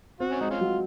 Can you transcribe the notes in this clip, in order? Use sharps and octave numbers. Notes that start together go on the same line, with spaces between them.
C4 F#4
C#4
G#3 D#4
C#4 F4
F#3